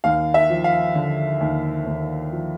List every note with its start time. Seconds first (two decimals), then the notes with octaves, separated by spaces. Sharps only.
0.04 D#2 F5
0.34 E5
0.50 F3
0.64 F5
0.95 D3
1.41 D#2
1.86 D#2
2.32 F3